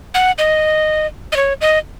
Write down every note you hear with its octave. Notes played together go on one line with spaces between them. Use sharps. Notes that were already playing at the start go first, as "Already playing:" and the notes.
F#5
D#5
D#5
C#5
D#5